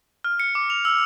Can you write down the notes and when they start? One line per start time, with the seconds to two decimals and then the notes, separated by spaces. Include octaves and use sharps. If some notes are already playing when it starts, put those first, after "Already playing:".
0.24 F6
0.40 C#7
0.55 D6
0.70 F7
0.85 E6